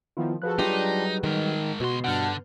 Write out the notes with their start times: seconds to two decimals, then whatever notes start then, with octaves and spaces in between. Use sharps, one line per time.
0.17 D#3 F3 B3 E4 F4
0.42 F3 F#4 G#4 A4 B4 F#6
0.59 F#3 G3 D4 D#4 F4 G4
1.24 D#3 G#3 A#4
1.80 C#2 B2 F#4 C6
2.04 G2 D3 F#5 A5 F6 G6